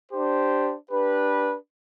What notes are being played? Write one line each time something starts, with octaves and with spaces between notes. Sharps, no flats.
D4 G4 C5
D4 G4 B4